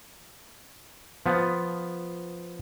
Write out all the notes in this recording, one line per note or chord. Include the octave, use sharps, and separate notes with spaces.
F3 B3